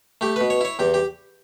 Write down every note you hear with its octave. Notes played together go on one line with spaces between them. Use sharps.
A3 G4
B2 B4
C#5
E4 C#5
E2 G4
G4